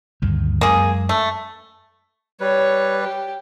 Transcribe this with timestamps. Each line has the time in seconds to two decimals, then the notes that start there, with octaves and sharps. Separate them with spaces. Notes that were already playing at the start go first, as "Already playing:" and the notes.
0.22 D2 G2 D#3
0.61 F#2 G#3 A#3 G#4
1.09 A3
2.41 G3 B4 C#5
3.03 G4